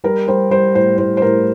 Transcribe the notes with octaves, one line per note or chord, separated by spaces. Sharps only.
G3 A#4
G3 C5
G3 C5
A2 C5
A2 C5
C5
A2 A#4